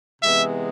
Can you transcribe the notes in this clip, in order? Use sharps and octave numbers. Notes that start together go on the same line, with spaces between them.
C3 E3 G#3 B3 E5